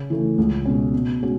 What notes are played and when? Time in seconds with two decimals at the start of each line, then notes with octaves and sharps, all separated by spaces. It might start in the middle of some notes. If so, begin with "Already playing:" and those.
Already playing: C#3
0.10 E3 A3
0.38 C#2
0.65 B2 G#3 C#4
0.94 B2
1.21 G#3 C#4 F#4